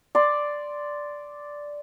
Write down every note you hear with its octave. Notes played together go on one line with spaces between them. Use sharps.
D5 C6